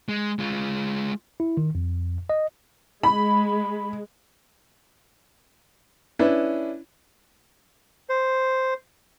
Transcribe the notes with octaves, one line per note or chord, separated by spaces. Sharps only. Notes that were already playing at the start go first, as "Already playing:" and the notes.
G#3
G#3 F4
E4
D#3
F2
D#5
G#3 B5
C#4 D4 E4 B4
C5